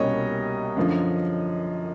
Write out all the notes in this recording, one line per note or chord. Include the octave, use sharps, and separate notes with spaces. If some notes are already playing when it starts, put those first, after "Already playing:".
Already playing: C2 B2 G3 A#3 C#4 C#5 D#5
F#2 D3 F3